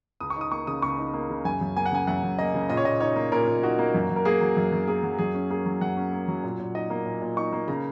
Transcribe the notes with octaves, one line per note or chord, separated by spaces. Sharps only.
C#2 D#6
C#6
D#4 D#6
A#3 C#6
C#3 D#6
C#2 C#6
D#4
A#3
C#3
F#2 G#5
F#2
A#3 G#5
F#5
C#3 G#5
F#2 F#5
F#2
A#3 D#5
C#3
A#2 D#5
C#5
A#2 D#5
D#4 C#5
A#3
A#2 A#4
A#2
D#4 F#4
A#3
F#2
F#2
A#4
A#3 G#4
F#3
F#2
F#2
A#3 G#4
F#3
F#2 G#4
C#4
A#3 G#4
F#3
F#2 F#5
C#4
A#3
F#3
A#2
A#2
D#4 D#5
A#3
A#2
A#2
D#4 C#6
A#3
C#3 A#5